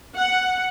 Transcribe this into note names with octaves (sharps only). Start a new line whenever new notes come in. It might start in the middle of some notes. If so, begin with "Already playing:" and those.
F#5